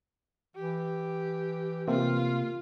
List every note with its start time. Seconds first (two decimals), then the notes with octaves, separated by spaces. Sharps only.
0.56 E3 G4
1.88 C3 A#3 F4